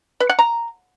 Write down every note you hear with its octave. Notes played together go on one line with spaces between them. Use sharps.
B4
F#5
A#5